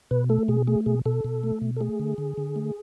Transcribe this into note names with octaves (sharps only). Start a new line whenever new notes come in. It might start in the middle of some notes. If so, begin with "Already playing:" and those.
B2 B4
A3 A4
B2 G#4
A3 G#4
B2 G#4
B2 A4
B2
A3
B2
A4
A3 G#4
D3
D3
D3
A3